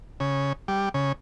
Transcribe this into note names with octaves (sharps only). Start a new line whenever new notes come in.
C#3
G3
C#3